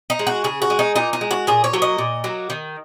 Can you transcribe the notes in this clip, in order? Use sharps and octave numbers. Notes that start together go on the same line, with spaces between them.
D#4
G#3
F#4
C#3 G#4
F#4
G#3
D#4
A#2 D#4
D#4
G#3
F#4
A#2 G#4
C#5
F#3 A#3
D#5
A#2
F#3 A#3
D#3